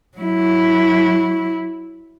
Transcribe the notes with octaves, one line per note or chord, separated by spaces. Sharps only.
F#3 E4